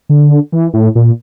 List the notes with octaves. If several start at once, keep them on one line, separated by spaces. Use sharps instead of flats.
D3
E3
A2
A#2